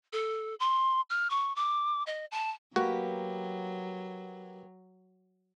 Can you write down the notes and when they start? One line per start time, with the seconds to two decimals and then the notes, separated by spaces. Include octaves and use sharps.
0.13 A4
0.60 C6
1.10 F6
1.30 C#6
1.56 D6
2.07 D#5
2.32 A5
2.76 F#3 A#3 B3 F#4 G4